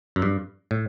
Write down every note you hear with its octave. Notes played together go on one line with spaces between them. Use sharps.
F#2
G2
A2